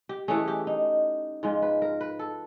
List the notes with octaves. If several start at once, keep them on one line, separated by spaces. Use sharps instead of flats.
G4
E3 A3 C#4 G#4
G4
D#4
G#2 F3 G#3 F4
B4
A#4
B4
A4